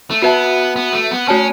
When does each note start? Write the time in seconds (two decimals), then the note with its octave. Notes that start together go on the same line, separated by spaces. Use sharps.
0.11 A3
0.22 B3 F#4 B4 E5 A5
0.76 B3
0.93 A3
1.11 B3
1.28 A3 C#4 F#4 C#5 A5